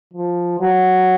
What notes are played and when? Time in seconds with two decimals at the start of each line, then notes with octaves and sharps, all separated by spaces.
0.14 F3
0.60 F#3